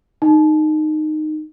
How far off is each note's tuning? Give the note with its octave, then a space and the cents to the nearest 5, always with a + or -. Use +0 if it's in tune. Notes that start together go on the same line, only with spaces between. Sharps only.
D#4 -15